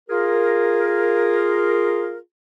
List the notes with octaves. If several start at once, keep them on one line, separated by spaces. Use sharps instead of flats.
F4 G#4 A#4